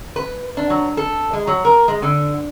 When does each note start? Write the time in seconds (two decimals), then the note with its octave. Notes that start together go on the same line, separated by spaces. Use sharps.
0.16 B4
0.57 D4
0.70 F#3
0.97 A4
1.33 G#3
1.47 F#3
1.65 A#4
1.88 G#3
2.02 D3